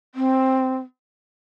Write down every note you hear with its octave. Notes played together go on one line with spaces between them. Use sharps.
C4